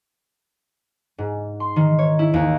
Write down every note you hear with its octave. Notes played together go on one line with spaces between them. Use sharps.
G#2
C6
D#3
C#5
E4
D#2